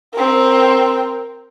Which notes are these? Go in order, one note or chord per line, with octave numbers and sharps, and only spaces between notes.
C4 A#4